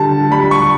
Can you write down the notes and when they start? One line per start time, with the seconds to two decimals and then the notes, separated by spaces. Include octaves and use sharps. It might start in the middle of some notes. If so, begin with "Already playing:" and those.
Already playing: D3 G3 A5
0.31 G3 B5
0.51 C#6